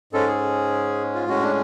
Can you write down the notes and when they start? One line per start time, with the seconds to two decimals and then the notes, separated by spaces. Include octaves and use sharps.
0.13 G#2 G#3 C#4 A4
0.28 G#4
1.14 F4
1.28 A2 G#3 C#4 F#4
1.42 D4